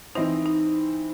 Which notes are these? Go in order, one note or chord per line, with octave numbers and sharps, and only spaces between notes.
E3 C4 D#4 E4 C5 D#5
D#4